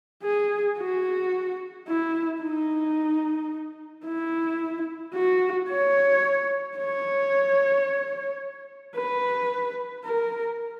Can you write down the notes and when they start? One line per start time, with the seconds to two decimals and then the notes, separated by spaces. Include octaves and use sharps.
0.24 G#4
0.79 F#4
1.88 E4
2.42 D#4
4.06 E4
5.14 F#4
5.69 C#5
6.78 C#5
8.96 B4
10.05 A#4